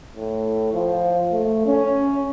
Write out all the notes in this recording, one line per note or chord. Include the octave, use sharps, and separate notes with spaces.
A2
F3
A3
C#4